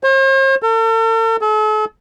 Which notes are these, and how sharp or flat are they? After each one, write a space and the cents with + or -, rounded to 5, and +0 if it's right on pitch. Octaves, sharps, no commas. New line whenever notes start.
C5 +45
A4 +45
A4 -40